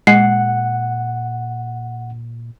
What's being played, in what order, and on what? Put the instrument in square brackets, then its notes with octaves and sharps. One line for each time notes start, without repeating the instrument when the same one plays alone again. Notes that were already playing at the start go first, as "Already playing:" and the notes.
[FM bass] A#2 [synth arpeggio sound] G#3 [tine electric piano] F#5 [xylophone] C7